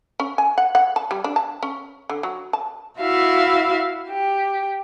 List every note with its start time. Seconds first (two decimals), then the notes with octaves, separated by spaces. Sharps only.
0.20 C#4
0.38 G#5
0.58 F#5
0.75 F#5
0.96 A5
1.11 G3
1.24 D4
1.36 A5
1.63 C#4
2.10 D3
2.23 F#3
2.53 A5
3.00 E4 F#4 E5 F5
4.09 G4